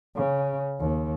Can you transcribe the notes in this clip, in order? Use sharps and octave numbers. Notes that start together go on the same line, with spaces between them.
C#3
D#2